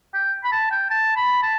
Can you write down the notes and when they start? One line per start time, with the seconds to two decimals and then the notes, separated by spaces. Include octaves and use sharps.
0.14 G5
0.44 B5
0.52 A5
0.71 G5
0.90 A5
1.17 B5
1.43 A5